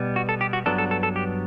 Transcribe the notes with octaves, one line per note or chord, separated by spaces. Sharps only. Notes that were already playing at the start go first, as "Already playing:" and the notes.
Already playing: B2 G3 B3
F#4
A4
G4
F#4
G2 F#3 B3 D4 A4
A4
A4
A4
G4